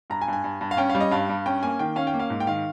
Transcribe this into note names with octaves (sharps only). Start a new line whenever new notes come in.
G2 A#5
G#5
G2
G#5
G2
G2
F5
C#4 G5
F5
G3
D#5
G2 F5
G2
C#4 G5
A#3 G#5
D#3 G5
C#4 F5
G5
A#3
F5
G#2
G5
D#3 F5